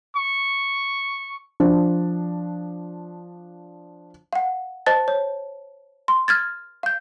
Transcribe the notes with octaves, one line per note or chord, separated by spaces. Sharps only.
C#6
F3 D4
F5 F#5
C5 D#5 A5 A6
C#5
C6
F6 G#6 A6
F5 G6